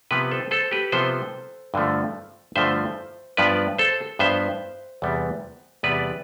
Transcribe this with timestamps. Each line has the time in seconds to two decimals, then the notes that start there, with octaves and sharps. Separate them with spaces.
0.11 C3 F3 B3 G4 B4
0.31 A4 C5
0.51 A4 C5
0.71 G4 B4
0.92 C3 F3 B3 A4 C5
1.74 G2 D3 F3 A3
2.56 G2 D3 F3 A3 C5 E5
3.37 G2 F3 B3 B4 D5
3.79 A4 C5
4.19 G2 F3 B3 C5 E5
5.02 E2 C3 G3 B3
5.83 E2 C3 G3 B3 B4 D5